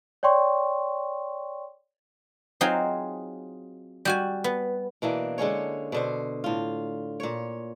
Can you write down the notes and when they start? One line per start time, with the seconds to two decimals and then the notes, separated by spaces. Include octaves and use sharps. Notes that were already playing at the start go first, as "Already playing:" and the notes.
0.23 C#5 D5 G5 C6 C#6
2.61 F#3 C4 D#4 F4 G#4
4.05 G3 F#4 G#5
4.44 B3
5.02 B2 E3 A#3 D4
5.38 D3 G#3 C#4 C#5
5.92 B2 D3 C5
6.44 A2 F4
7.20 A#2 C#5